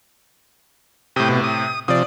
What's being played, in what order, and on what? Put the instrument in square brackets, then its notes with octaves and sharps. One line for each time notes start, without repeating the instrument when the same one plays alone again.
[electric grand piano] A2 C3 [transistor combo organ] G5 D#6
[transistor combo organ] B2
D#6
[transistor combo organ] C3 F3 [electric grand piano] D5 D#6